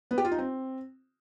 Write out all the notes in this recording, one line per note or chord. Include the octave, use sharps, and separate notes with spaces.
B3
G4
F4
D#4
C4